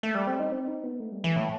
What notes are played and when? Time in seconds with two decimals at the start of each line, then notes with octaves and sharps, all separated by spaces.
0.03 A3
0.15 G3
0.27 C4
0.39 D#4
0.52 C4
0.68 D#4
0.84 B3
1.00 A3
1.12 G3
1.24 E3
1.36 A2